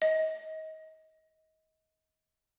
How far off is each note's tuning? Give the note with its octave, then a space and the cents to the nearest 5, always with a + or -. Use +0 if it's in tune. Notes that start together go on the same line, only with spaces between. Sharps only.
D#5 +30